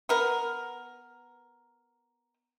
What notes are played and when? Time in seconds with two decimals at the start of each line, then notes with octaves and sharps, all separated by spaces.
0.09 B3 A#4